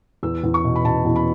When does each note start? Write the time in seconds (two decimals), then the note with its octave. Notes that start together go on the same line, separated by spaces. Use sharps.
0.23 E2 E6
0.44 E2
0.54 C#6
0.64 B2
0.76 B5
0.85 B2 A5
1.05 E2
1.16 B5